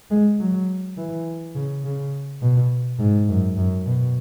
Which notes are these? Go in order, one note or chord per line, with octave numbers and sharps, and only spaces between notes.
G#3
F#3
E3
C#3
C#3
B2
G#2
F#2
F#2
B2